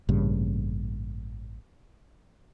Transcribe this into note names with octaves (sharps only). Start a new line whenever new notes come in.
A1 G2 A#2 C#3